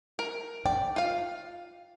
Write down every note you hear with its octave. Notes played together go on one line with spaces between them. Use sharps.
A#4
D5 G5
F4 F5